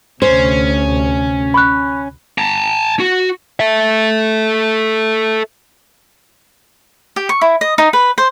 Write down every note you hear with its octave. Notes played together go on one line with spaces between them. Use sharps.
D2 C3 C#4 C5
B5 C#6 F#6
A5 A#5
F#4
A4 E5
G4
C#6
E4
D#5
D#4
B4
C5